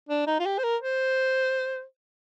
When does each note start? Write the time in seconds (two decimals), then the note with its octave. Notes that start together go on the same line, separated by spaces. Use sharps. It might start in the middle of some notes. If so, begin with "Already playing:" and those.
0.09 D4
0.27 D#4
0.40 F4
0.46 G4
0.58 C5
0.64 A#4
0.81 C5